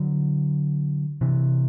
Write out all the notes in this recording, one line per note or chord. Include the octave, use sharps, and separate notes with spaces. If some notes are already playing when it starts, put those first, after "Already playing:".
Already playing: D3 F#3
C3 E3